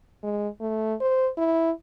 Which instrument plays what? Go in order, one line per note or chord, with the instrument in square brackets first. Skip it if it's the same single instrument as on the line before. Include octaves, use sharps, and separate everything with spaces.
[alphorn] G#3
A3
C5
E4